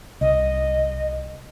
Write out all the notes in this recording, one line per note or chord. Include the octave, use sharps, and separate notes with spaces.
C2 D#5